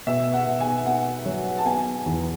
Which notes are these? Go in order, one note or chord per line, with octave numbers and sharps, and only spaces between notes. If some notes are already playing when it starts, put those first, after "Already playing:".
B2 E5
F#5
B2
G#5
B3 F#5
F#3
A5
B3 G#5
E2